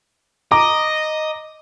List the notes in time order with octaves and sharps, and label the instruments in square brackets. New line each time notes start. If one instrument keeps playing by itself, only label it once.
[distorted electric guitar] D#5 [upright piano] A#5 D6